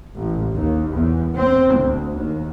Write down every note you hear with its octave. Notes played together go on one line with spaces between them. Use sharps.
A1
D#2
E2
C4
D2
D#2